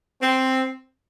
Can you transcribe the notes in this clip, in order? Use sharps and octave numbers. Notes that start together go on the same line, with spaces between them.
C4